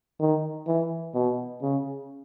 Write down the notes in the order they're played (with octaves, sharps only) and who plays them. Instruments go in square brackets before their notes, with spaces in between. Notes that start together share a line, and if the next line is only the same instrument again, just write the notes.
[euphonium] D#3
E3
B2
C#3